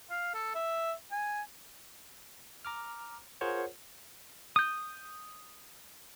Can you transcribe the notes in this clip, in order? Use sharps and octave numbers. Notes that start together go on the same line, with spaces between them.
F5
A4
E5
G#5
A#5 D6 F6
F4 G#4 A#4 C5 C#5 F#5
D#6 G6